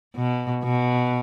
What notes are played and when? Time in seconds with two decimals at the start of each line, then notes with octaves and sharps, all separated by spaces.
0.16 B2
0.64 B2